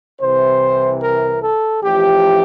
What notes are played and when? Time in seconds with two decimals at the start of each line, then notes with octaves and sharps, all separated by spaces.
0.21 C2 C3 E3 C5
1.02 A#4
1.43 A4
1.83 A1 A2 F3 G4